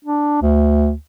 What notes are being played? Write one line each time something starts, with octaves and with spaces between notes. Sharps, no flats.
D4
D2